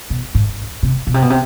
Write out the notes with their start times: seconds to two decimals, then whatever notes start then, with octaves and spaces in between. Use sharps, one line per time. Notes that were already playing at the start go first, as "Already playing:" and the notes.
0.10 B2
0.35 G#2
0.83 C3
1.07 B2
1.14 C3
1.22 B2
1.30 C3